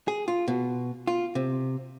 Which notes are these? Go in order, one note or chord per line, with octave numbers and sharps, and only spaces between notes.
G#4
F4
B2
F4
C3